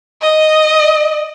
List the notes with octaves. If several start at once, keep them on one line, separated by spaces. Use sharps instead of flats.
D#5